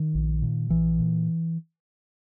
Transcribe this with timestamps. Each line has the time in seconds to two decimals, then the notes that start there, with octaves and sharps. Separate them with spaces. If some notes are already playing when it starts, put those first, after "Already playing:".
Already playing: D#3
0.15 A#1
0.42 A#2
0.70 A#1 E3
0.99 A#2